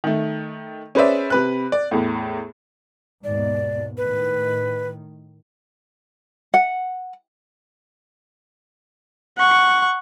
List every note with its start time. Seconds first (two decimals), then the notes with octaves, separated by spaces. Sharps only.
0.04 D#3 A3
0.95 C#4 G#4 B4 C5 D5 E5
1.30 C3 B4 F#6
1.72 D5
1.91 E2 A2
3.24 D#2 G#2 B2 D5
3.97 A2 D#3 B4
6.54 F#5
9.38 F#5 C#6